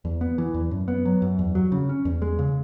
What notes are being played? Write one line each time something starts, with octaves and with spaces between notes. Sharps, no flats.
E2
B3
E3
E2
F#2
B3
F#3
F#2
E2
F#3
C#3
C#4
E2
G#3
C#3